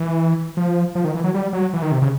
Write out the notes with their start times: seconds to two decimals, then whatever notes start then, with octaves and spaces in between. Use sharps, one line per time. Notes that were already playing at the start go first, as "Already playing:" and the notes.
Already playing: E3
0.57 F3
0.95 F3
1.05 D#3
1.15 E3
1.24 F#3
1.34 G3
1.53 F#3
1.73 E3
1.82 D#3
1.92 C3
2.02 C#3